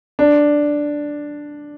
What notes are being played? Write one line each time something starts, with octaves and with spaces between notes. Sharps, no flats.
D4